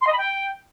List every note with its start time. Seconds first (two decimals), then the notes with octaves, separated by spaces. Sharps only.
0.01 C6
0.07 D#5
0.12 B5
0.18 G5